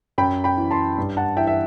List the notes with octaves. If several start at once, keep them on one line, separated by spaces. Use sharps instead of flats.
F#2 G5 B5
G5 B5
E3
A5 C6
G2
F#5 A5
E3 E5 G5
E5